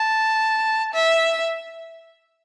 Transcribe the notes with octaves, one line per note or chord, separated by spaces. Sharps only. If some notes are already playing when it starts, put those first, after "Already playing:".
Already playing: A5
E5